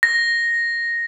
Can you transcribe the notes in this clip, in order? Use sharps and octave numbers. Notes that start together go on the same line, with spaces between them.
A#6